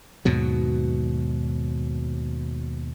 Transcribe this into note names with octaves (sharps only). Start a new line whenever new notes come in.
D#2 G#2 B2 F#3